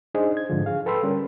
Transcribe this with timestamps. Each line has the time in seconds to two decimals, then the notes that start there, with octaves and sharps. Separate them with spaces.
0.14 D4 D#4 G#4 C5 D#5
0.37 G#6
0.50 G#2 D3 F3
0.66 G#4 F5
0.86 A4 B4 G5 B5 C6 E6
1.03 D3 G3 C#4 G4 A#4